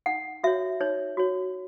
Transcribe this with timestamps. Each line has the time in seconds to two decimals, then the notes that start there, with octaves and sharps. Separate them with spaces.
0.06 D#4 F#5
0.44 F#4 C#5 E5
0.81 D#4 C#5
1.17 F#4 C#5